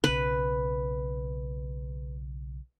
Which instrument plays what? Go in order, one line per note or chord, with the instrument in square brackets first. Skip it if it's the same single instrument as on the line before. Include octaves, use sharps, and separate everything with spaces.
[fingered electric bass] B1 C#3 [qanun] B4